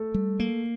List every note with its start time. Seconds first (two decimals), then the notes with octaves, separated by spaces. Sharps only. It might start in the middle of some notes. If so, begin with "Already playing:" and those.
Already playing: A3 A4
0.14 G3
0.40 A#3